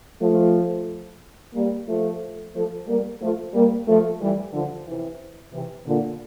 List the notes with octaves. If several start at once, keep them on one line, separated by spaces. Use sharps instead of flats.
F3 A3
G3 A#3
F3 A3
F3 A3
G3 A#3
F3 A3
G3 A#3
F3 A3
E3 G3
D3 F3
C3 E3
C3 E3
A#2 D3